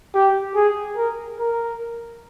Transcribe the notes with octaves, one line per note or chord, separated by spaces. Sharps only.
G4
G#4
A#4
A#4